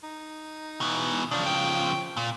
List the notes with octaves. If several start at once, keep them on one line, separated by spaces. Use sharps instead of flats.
D#4
B2 E3
C#3 F3 D4
G5
A#2